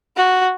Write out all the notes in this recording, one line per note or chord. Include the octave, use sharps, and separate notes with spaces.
F#4